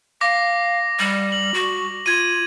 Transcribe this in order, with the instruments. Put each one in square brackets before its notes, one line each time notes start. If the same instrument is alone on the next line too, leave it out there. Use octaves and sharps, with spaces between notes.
[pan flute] F5 [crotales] D6 A#6
[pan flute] G3
[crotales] F#7
[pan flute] F#4
[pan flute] F4 [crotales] G#6 D#7